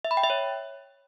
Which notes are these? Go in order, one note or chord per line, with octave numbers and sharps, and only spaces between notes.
E5
B5
G5
E5
C#5